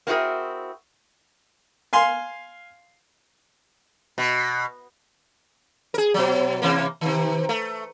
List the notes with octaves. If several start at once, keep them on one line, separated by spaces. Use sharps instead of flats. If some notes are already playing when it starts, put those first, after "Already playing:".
A#3 C4 E4 F#4 G#4 A#4
F5 G#5 C6
B2
G#4 A#4
B2 F#3
C3 E3 A#3
C3 D#3
A3